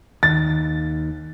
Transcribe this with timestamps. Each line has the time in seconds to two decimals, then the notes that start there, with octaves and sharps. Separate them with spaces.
0.23 D#2 D#3 A6